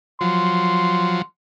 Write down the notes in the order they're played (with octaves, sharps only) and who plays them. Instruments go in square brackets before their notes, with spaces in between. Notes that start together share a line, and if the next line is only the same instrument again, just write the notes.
[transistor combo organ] F3 F#3 [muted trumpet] C6